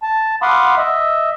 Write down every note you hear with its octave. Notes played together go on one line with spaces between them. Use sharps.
A5
F5 F#5 B5 C6 D6 D#6
D#5 E5